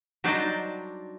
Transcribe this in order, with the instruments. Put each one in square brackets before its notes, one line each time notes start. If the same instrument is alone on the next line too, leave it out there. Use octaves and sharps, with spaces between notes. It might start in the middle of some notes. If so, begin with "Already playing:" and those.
[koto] F#3 G3 D4 D#4 C5 D5